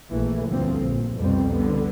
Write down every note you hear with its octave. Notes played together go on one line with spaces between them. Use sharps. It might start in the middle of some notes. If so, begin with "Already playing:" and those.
A#1 E3 A3
D2 G2 F3 C4
A#1
C2 F2 B2 G3 C4
D3 B3